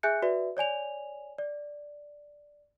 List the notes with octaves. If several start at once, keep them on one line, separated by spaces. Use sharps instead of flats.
G#4 E5 G#5 F#6 G6 C#7
F#4 B4 D5 E5
C#5 D5 G#5 F7
D5